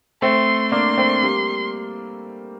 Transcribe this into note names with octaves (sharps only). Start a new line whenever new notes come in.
A3 C4 C6
A#3 D4 C6
A3 C4
G3 A#3